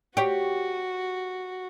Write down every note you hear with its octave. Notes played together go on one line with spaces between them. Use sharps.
F#4 G4 C#5